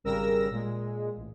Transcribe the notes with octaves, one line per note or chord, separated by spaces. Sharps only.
G#1 C#3 G3 A#4 E6 A#6
A#2 G#3
A1